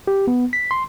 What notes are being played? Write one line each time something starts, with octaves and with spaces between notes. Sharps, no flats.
G4
B3
B6
C6